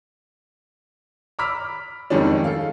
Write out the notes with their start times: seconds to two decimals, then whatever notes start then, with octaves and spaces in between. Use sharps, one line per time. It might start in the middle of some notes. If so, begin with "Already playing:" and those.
1.39 A#5 B5 D6 E6 F6 B6
2.10 F2 G#2 D#3 G3 C#4 D4
2.44 A4 F5